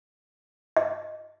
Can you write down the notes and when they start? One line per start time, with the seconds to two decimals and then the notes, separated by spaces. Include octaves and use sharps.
0.77 D#5